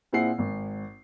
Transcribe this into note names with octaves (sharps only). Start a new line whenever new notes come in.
A#2 C4 E4 G#4 F#5 C7
G#1